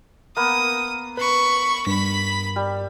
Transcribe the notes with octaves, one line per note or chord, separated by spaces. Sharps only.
A#3 B3 D#6
B4 B5 C#6
G2 B5 B6
G3